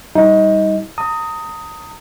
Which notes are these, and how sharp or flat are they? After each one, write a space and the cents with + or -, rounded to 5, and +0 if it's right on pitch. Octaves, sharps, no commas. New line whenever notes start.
G3 +10 D#4 +25 D#5 +20
A#5 -30 D#6 +10